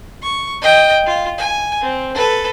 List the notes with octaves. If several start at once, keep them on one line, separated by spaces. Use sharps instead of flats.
C#6
D#5 G5
F4
G#5
C4
A4 B4